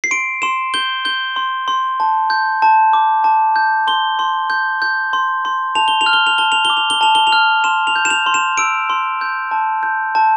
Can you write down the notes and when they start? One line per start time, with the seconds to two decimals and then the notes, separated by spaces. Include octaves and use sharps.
0.04 C7
0.11 C6 D7
0.42 C6 E7
0.74 G6 G7
1.05 G6 G7
1.36 C6
1.68 C6
2.00 A5
2.30 G6
2.62 A5
2.93 D6
3.24 A5
3.56 G6
3.87 C6 G7
4.19 C6
4.50 G6
4.82 G6
5.13 C6
5.45 C6
5.75 A5 F7
5.88 G7
6.01 F7
6.06 F6
6.13 G7
6.27 F7
6.38 A5 G7
6.52 F7
6.65 G7
6.70 D6
6.77 F7
6.90 G7
7.01 A5 F7
7.15 G7
7.27 F7
7.32 F6
7.64 C6 E7
7.87 F7
7.96 G6
8.05 E7
8.10 F7
8.26 C6
8.34 E7
8.58 E6 D7
8.90 C6
9.21 G6
9.51 A5
9.83 G6
10.15 A5